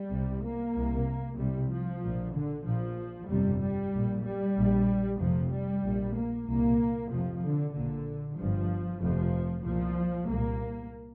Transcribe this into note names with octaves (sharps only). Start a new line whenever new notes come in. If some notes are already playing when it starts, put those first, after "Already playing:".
Already playing: G3
C2 C3
A#3
C2 C3
C2 C3 G3
F3
A#1 A#2
D3
A#1 A#2 F3
G1 F2 C3 G3
G3
A#1 A#2
G3
A#1 A#2
F1 F2 C3 F3
G3
A#1 A#2
A#3
C2 A#2 A#3
F1 F2 C3 F3
D3
A#1 A#2 D3
G1 G2 F3
F1 F2 C3 F3
C2 A#2 F3
C2 A#2 A#3